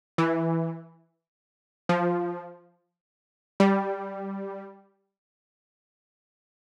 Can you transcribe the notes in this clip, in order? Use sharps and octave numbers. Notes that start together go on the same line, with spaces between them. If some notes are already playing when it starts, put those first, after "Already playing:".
E3
F3
G3